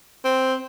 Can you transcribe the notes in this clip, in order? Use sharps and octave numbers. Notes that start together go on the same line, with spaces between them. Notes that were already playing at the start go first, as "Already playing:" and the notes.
C4